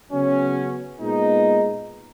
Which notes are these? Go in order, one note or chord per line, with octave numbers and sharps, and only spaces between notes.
C#3 F#3 B3 C#4
A#2 G#3 B3 D#4